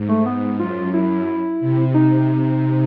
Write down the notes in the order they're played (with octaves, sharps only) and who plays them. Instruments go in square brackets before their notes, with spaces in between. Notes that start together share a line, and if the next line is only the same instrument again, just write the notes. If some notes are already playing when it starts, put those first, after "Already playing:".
Already playing: [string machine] G#2
[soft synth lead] A3
B3
[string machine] F#2 [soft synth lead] F4
[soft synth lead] E4
[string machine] C3
[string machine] C3 [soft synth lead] D#4